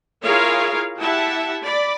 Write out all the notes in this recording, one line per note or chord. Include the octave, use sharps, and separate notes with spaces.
E4 F4 G#4 A#4 C#5 F5
E4 G4 E5 F#5 A5
D5 B5